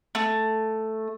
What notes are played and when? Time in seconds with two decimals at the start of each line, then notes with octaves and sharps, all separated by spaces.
0.15 A3